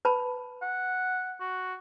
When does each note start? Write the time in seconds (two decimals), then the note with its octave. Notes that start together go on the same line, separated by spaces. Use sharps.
0.05 B4 A5 B5
0.62 F#5
1.40 F#4